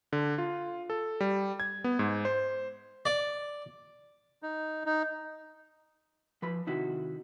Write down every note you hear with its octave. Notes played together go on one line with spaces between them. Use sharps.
D3
F4
A4
G3
G#6
B3
G#2
C5
D5
D#4
D#4
F3 B4 B5
C3 D#3 E4 F#4